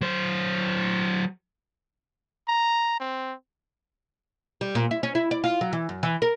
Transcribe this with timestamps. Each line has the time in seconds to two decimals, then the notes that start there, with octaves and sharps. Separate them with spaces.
0.01 F#3 C5
2.48 A#5
3.00 C4
4.61 G3
4.75 A#2
4.91 E4
5.03 C#4
5.15 E4
5.31 D5
5.44 F4
5.61 F#3
5.73 E3
5.89 F#2
6.03 E3
6.22 A#4